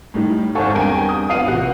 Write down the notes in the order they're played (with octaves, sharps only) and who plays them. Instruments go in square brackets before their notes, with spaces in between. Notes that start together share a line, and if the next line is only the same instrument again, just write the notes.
[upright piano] A2 D#3 G3
[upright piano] G#1 C#6 [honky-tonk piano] A4 C5 [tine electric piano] F5 F#5 G#5
[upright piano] E2 [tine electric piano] G3 C4 D4 [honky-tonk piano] A#4 G5 G#5
[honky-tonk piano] D#6
[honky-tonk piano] F3 B3 [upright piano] F5 C7 D#7
[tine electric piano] A1 [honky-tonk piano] C3 F#4